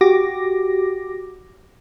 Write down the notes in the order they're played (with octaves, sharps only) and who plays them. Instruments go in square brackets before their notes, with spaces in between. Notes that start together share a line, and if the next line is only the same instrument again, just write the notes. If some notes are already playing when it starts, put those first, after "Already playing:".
[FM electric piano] F#4 G4 D6 A#6